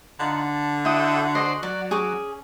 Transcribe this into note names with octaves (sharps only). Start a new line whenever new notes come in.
D3 D#4 F4 F#5
A5
E4 F#4 D#5 F#5 G5 D#6 E6
C5 D5 D#5 G#5 C6
F#3 D5
C#4 G#4 C#6 D6